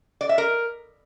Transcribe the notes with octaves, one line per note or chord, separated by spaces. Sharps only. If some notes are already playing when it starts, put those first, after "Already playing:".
D5
E5
A#4